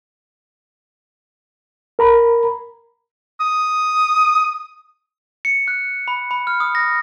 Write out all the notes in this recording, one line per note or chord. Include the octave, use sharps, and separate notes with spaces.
A#4 A#5 B5
D#6
C#7
F#6
B5
B5
F6
D#6
A#6